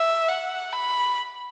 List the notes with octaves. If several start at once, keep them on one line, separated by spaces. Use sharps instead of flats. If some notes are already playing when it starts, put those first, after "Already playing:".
Already playing: E5
F#5
B5